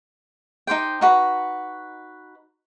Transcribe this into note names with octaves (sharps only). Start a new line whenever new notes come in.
D#4 G4 C5 G5
D#4 F#4 B4